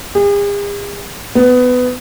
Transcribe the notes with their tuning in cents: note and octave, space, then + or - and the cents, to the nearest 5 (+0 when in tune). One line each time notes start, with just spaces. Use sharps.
G#4 -45
B3 +20